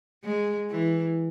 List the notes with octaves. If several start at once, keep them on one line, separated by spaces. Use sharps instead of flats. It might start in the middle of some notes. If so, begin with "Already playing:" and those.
G#3
E3